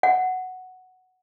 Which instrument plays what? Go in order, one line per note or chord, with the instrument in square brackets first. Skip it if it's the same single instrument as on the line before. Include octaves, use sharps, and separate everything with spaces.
[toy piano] F#5